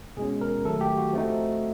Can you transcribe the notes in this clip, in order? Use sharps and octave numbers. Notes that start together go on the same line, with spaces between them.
B2 G#3 C#4 G#4
A#4
D#3 F#3 A3 A4
G4
F#4
F3 A3 C4 D#4